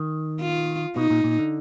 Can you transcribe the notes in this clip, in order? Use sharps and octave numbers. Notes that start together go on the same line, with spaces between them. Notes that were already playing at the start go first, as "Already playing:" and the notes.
Already playing: D#3
F4
B2 D#4
A#2
A#2
D3